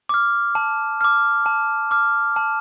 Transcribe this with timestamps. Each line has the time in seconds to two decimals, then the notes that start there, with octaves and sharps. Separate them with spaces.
0.09 D6 F6
0.55 A5
1.01 D6 F6
1.46 A5
1.91 D6 F6
2.36 A5